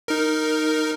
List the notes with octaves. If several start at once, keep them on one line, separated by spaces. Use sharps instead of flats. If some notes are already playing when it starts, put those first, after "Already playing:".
D#4 A#4